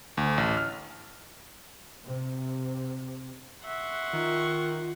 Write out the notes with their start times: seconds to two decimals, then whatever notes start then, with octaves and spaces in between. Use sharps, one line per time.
0.17 D2
0.38 A1
0.57 F6
2.05 C3
3.66 E5 F#5 C6 C#6
4.13 D#3 F4